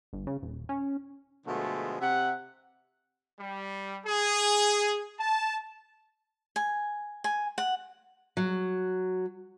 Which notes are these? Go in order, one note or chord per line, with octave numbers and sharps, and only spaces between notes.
G1
C#3
D#1
C#4
B2 D3 F3 G#3 A3
C3 E5 F#5
G3
G#4
A5
G#5
G#5
F#5
F#3